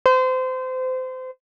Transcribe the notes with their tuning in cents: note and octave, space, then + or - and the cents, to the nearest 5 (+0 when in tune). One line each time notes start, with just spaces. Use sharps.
C5 -30